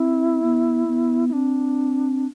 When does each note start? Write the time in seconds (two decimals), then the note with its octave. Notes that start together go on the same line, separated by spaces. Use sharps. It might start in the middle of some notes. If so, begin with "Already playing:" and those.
Already playing: C4 E4
0.42 B3
0.88 B3
1.29 E4
1.33 C4 D4